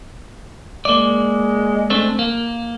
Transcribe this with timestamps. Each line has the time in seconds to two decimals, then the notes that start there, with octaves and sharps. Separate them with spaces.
0.85 G#3 A#3 D5
1.90 A3 C4 D4
2.19 A#3